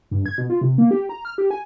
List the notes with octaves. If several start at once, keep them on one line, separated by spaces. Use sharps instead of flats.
G2
G#6
B2
F4
C3
A#3
G4
A#5
F6
G4
G#5